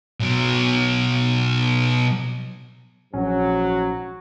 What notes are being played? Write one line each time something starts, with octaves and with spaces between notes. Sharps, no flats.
B2 F#3
A#1 G#2 F#3 C#4